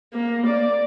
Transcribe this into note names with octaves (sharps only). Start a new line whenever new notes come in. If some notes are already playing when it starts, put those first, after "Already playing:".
A#3
D5